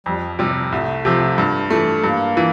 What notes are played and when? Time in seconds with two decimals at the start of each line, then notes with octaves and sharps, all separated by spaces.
0.06 F2 G3
0.23 F3
0.39 C3 E3 G3
0.56 F3
0.72 C2 A3
1.05 C3 F3
1.38 G2
1.70 E3 A3
2.04 G2 A#3
2.37 E3